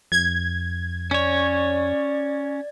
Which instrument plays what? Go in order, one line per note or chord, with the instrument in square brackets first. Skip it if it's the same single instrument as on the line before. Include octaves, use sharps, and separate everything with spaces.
[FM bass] F2 [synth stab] G#6
[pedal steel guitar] C#4 C#5 [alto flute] D5